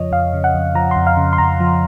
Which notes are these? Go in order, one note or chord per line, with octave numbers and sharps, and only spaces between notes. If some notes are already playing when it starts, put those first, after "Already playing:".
Already playing: F2 C#3 F3 C#5 D#5
F2 F5
C#3
F#5
F2
F3 A#5
F2 C6
F5
C#3
C6
F2 A#5
F3